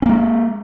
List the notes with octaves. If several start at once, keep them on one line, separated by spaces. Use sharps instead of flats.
G#3 A#3 C#4